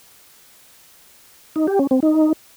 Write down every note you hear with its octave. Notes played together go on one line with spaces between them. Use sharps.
D#4
G4
C#4
C4
D#4